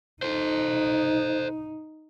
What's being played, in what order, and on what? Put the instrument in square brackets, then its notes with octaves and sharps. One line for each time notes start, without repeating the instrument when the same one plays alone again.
[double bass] D#4 [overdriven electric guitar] A4 C5